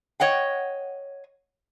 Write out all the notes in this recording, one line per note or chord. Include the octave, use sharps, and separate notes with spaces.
C#5 D#5 F#5 G5